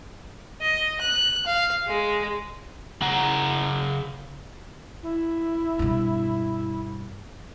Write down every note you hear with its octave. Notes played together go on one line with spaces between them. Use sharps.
D#5
F#6
F5
G#3
C#3 F#5 A#5
E4
G2 B2